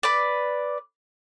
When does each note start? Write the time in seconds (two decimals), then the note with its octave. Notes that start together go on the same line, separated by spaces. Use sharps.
0.03 B4 D5